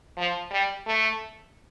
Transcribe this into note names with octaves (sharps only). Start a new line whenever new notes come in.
F3
G3
A3